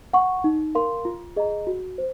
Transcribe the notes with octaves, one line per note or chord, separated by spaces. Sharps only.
F#5 C#6
D#4
A#4 F5 C6
F4
G#4 D#5 A#5
F#4
C5